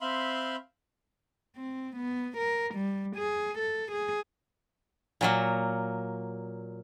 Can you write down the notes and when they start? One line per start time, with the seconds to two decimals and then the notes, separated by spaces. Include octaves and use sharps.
0.01 C4 E5 F5 B5 C6
1.57 C4
1.97 B3
2.38 A#4
2.75 G3
3.17 G#4
3.59 A4
3.92 G#4
5.21 A#2 F#3 A#3